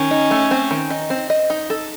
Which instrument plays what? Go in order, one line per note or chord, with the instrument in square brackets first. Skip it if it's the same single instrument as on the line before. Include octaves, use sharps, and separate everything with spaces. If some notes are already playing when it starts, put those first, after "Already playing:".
Already playing: [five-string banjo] D#3 [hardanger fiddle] C#4
[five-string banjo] D#4
A3
C4
D#3
D#4
C4
D#5
D#4
A4